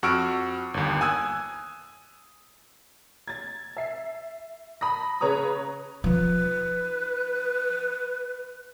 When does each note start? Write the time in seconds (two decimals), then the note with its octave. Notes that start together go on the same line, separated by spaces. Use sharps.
0.03 F2 F#4 C#6 E6 F6 D7
0.74 G1 D#2
1.01 G#5 D#6 E6 F#6 G#6
3.28 G#6 A6
3.77 E5 C7
4.81 A5 B5 D#6 A#6
5.21 C#3 B4 C#5 A#5 D#6
6.04 F3 D#4 B4